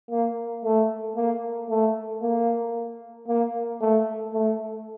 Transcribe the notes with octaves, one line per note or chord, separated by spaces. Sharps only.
A#3
A3
A#3
A3
A#3
A#3
A3
A3